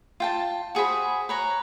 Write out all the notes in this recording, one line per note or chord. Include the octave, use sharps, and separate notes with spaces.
F4 G5 A5
F#4 G#4 C5 B5
B4 C#5 A#5